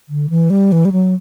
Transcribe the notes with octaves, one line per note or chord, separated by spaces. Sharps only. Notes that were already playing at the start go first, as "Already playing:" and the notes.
D3
E3
G3
E3
G3
F#3